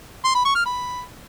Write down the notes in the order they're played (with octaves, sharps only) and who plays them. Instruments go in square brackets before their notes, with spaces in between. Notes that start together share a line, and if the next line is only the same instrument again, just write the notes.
[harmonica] C6
B5
C#6
F6
B5